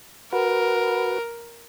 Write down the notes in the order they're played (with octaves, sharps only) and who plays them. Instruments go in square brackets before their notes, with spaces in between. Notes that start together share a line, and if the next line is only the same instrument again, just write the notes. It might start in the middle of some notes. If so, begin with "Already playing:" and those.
[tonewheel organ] F#4 B4 [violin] A#4